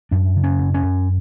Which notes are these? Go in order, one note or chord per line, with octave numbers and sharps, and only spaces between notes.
F#2 D4
C#3
C#4
F#2
C#4
F#2